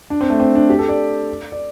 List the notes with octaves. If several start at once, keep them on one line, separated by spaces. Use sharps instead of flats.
D4
C4
A3
C4
D4
G4
A4
D5
D5